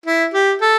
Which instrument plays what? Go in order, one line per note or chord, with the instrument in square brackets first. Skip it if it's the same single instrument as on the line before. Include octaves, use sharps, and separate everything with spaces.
[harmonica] E4
G4
A4